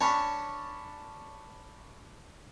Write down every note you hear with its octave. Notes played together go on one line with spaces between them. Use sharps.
C#4 D4 C#5 A5 B5